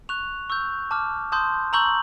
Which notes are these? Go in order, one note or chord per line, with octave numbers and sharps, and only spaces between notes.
C#6 F#6 F7
C#6 E6 G6
A5 D6 F6
A5 C6 D#6 G6
A#5 C#6 E6 G6 F#7